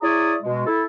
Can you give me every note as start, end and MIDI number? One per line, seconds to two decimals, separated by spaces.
0.02 0.33 64
0.02 0.33 68
0.02 0.33 73
0.02 0.33 74
0.02 0.33 82
0.02 0.33 87
0.43 0.65 47
0.43 0.65 56
0.65 0.83 64
0.65 0.83 69